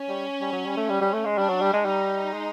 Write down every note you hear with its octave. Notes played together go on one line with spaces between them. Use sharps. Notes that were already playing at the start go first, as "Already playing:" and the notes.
Already playing: C#4
G3
G3
F#3
G3
A3
G3
G3
A3
G#3
G3 D4
F#3
G3
G#3
G3 D#4
G#3